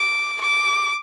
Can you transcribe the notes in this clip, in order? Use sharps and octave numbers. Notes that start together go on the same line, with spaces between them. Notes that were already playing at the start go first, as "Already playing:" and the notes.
Already playing: D6
D6